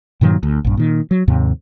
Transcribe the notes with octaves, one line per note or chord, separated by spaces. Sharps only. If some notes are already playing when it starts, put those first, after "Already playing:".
G2 A#2 D#3 F#3
D2
A#1 G2
A#2 D#3
F#3
D#2 G#2 C3